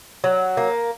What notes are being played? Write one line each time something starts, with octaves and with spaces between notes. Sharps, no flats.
F#3
A#3